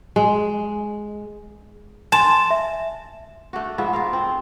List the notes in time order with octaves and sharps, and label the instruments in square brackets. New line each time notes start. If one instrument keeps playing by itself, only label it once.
[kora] G#3
[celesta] G#5 C6 E7 [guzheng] A5
[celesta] E5
[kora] A3 D4 F#4
G#2 F3 B3 E5
F4 A#4 F5
C4